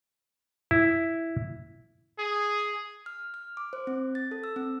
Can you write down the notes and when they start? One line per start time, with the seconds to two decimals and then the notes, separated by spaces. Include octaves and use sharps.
0.71 E4
2.19 G#4
3.06 F6
3.34 F6
3.57 D6
3.73 C5
3.87 C4
4.15 A6
4.31 A4
4.44 E6
4.56 C4